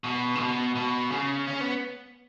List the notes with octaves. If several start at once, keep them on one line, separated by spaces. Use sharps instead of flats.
B2
C#3
B2
B2
C#3
C#4
B3